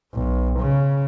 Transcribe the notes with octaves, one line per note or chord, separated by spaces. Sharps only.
B1
C#3